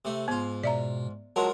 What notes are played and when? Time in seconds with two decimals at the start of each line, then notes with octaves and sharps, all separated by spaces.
0.05 C3 A3
0.28 G#2 B3 F4
0.64 B2 D5 E5 A#5
1.36 F#3 G#3 F4 A#4 A5